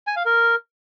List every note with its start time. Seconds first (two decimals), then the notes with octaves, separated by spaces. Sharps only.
0.07 G#5
0.16 F5
0.26 A#4